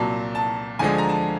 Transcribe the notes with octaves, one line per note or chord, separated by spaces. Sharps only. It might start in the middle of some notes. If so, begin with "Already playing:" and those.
Already playing: C2 A#2 F#3 A5
A5
D2 D3 F3 G#3 G#5
A#5
A5